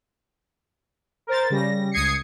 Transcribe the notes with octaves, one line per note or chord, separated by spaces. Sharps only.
A#4 C5 A6
C#3 G3 A#6
C#2 D#6 G#6 C7 C#7